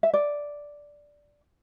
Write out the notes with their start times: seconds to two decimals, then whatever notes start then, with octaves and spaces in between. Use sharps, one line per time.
0.03 E5
0.14 D5